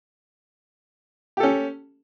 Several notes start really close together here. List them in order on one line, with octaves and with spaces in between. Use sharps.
G4 A4 C#4